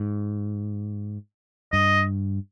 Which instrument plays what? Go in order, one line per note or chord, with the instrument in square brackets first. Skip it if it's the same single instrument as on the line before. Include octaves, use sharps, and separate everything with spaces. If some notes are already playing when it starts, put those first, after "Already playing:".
Already playing: [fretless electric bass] G#2
[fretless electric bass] G2 [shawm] D#5